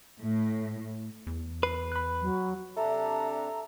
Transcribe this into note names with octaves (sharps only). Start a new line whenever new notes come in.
A2
E2
B4 C7
B5 F#6
F#3
C3 D4 G4 A4 E5 A#5